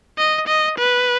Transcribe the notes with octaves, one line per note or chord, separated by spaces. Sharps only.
D#5
D#5
B4